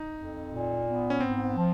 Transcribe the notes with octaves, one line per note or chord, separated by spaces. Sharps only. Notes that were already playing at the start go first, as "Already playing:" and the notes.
Already playing: D#4
F2
A#2
B3
C#4
G#2 C4
F3